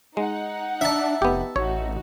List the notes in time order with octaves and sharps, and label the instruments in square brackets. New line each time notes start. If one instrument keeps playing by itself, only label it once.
[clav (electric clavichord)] G#3 [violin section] D#4 F#5
[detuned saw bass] D4 [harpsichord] E5 A5
[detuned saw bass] F1 [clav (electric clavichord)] B3 G4
[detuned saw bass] A1 [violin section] D#4 F#4 [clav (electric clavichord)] C#5